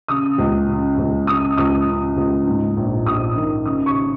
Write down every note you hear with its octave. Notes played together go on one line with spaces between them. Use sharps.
C#3 D#6
C#2
C#3
C#2
C#3 D#6
C#2 D#6
C#3
C#2
G#2
A#1
A#1 D#6
D#3
C#3 D#6
C#6